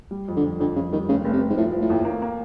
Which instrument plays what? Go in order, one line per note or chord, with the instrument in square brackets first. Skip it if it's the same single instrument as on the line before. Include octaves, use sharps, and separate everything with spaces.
[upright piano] G3
F2
[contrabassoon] D3
[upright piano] F2
[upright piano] F2 [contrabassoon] D3
[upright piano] F2 [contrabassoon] C#3
[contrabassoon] D#3 [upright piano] G3
[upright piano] F1 [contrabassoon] C#3
[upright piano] F1
[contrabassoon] C3
[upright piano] F1
[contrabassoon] G#2
[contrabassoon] A2 [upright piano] F3
[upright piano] F3
[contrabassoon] A2
[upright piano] D#2
A#3
A#3